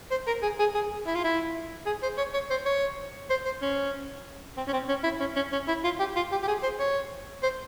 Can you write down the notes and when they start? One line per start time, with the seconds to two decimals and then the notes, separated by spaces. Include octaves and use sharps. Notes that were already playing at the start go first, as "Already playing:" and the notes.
0.11 C5
0.27 A#4
0.43 G#4
0.59 G#4
0.75 G#4
1.07 E4
1.15 F4
1.24 E4
1.86 G#4
2.02 C5
2.17 C#5
2.34 C#5
2.50 C5
2.66 C#5
3.30 C5
3.45 C5
3.62 C#4
4.57 C4
4.67 C#4
4.73 C4
4.88 C#4
5.04 E4
5.20 C#4
5.36 C#4
5.52 C#4
5.68 E4
5.84 F4
5.99 G4
6.16 F4
6.32 G4
6.42 G4
6.48 G#4
6.63 C5
6.79 C#5
7.43 C5